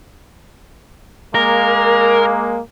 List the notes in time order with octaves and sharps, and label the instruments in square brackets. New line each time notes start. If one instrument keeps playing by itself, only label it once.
[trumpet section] G#3 A#3 [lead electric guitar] A#4